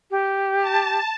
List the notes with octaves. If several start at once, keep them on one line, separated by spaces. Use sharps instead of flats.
G4
A5